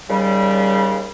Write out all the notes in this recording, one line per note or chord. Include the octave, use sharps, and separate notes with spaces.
D#2 C#3 G3